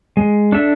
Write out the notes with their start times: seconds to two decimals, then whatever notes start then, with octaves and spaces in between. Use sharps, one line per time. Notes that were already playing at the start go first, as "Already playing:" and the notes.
0.17 G#3
0.52 D4 A4 E5